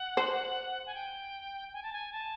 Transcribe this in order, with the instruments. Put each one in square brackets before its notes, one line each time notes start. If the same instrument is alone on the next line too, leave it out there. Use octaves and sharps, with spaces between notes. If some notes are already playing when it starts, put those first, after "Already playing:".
Already playing: [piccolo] F#5
[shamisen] C5
[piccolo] G#5
G5
G#5
A5
G#5
A5